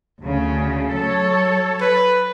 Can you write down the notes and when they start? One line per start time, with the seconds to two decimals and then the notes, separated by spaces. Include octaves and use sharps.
0.23 D2 C#3
0.92 F#3 A4 C#5
1.81 B4